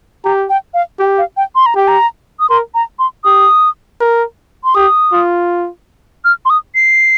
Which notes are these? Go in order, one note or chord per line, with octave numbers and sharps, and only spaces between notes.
G4 A#5
G5
F5
G4 G5
F5
G5
C6
A#5
G4 G5
A#5
D#6
A#4 C6
A#5
C6
G4 D#6
A#4
C6
G4 D#6
F4
F6
C6
D#6
C7